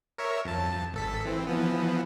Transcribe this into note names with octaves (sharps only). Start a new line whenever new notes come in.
A#4 C#5 E5
F2 A5
G#1 A4 B6
E3 C4
E3 F3 B3